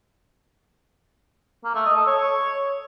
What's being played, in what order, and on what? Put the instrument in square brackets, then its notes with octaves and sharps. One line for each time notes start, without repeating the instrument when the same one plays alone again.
[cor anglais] A#3
A3
D#5
A4
C#5